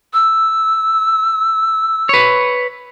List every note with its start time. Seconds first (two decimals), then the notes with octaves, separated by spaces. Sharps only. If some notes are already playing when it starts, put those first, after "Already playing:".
0.13 E6
2.09 B4 C#5